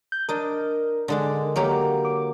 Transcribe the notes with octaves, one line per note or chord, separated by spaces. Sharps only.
G6
D4 A#4 D#5
D3 G#3 D4
F#3 A#3 G4
D6